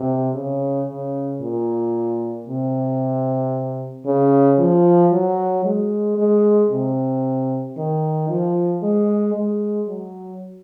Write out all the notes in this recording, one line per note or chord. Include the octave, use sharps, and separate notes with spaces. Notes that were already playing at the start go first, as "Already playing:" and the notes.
Already playing: C3
C#3
C#3
A#2
C3
C#3
F3
F#3
G#3
G#3
C3
D#3
F3
G#3
G#3
F#3